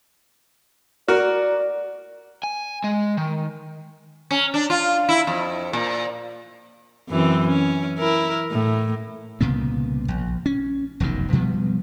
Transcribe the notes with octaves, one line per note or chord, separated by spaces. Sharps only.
F#4 A#4 D5
G#5
G#3
D#3
C#4
D4
F4
E4
F2
A#2
F#2 E3 C4
C#4
E4 A#4
A2
C2 A#2 C#3 B3
A#1
C#4
F1 B1 F#2 D#3
B2 F3 G3 B3